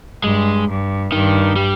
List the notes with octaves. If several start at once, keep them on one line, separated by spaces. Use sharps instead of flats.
G2 G#3
G2
G2 D#3
G3